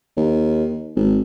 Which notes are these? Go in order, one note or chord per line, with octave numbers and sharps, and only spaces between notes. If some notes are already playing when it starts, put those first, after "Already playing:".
D#2
G#1